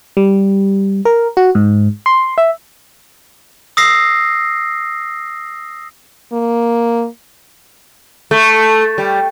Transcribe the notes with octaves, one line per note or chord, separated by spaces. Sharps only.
G3
A#4
F#4
G#2
C6
E5
D#6 E6 A#6 C7
A#3
A3
G3